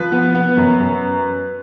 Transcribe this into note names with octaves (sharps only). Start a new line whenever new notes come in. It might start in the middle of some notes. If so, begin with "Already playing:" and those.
Already playing: F3 B4
B3
B3
F#2
F#2